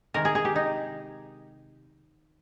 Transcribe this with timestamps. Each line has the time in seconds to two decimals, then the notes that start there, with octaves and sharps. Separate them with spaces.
0.14 C3 D#3 G#3 A#4
0.25 G#4
0.35 G#4
0.45 G4
0.56 D#4